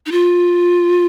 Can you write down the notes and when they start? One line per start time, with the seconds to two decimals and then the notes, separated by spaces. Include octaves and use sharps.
0.06 D#4
0.12 F4